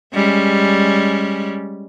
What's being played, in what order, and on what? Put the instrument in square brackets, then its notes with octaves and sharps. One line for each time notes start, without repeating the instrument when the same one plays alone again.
[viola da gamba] G3 G#3 C#4